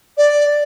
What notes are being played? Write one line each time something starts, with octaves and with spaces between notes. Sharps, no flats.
D5